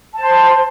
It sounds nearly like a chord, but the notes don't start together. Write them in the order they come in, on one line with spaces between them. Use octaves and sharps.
A5 C5 C6